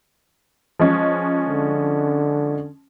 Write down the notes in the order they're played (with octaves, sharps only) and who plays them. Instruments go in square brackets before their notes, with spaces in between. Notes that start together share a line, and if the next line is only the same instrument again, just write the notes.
[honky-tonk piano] F3 G#3 C#4
[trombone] D3